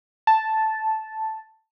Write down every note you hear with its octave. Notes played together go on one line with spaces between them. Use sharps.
A5